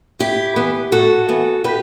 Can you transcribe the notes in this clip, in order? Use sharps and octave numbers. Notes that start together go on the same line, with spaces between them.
A2 E4 G4
E3 B3
A2 F#4 A4
E3 B3
A2 G4 B4